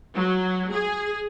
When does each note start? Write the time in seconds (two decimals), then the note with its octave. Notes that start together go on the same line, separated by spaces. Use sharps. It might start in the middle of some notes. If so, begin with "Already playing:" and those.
0.14 F#3
0.70 G#4